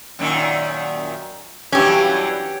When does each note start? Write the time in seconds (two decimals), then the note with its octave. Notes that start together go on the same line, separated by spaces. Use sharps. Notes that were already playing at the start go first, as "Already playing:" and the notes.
0.19 F#2 A#2 D#3
1.72 G2 E3 F#3 C#4 G4